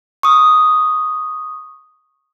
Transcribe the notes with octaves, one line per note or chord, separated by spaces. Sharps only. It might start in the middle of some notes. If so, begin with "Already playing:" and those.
C#6 D#6